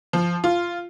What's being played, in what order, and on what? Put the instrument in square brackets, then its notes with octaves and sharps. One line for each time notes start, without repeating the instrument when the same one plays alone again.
[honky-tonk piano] F3
F4